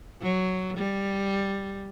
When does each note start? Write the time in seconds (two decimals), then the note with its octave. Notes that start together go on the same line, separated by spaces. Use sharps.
0.22 F#3
0.77 G3